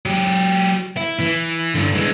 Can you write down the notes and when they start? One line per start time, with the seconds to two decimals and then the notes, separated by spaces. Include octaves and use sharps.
0.06 F#3 G4
0.97 E4
1.20 E3
1.75 G2 D3
1.95 E3 G#3